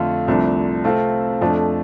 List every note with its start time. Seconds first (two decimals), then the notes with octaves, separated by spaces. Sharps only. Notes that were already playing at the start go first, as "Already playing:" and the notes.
Already playing: F2 D3 A3 F4
0.27 C2 C3 F3 A3 D4
0.84 C3 A3 C4 F4 A4
1.41 F2 F3 A3 D4